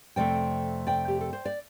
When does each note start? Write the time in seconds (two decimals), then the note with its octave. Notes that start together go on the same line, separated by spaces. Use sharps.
0.16 F2 C3 A3 D5 G5
0.87 D5 G5
1.08 G4
1.21 A4
1.33 C5
1.45 D5